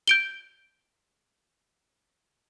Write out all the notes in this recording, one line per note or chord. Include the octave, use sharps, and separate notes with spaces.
G6 D7 G7